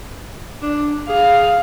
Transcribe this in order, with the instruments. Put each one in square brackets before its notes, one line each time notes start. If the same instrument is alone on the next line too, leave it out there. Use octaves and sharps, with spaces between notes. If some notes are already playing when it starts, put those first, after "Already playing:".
[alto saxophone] D4
[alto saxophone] G#4 [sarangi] F5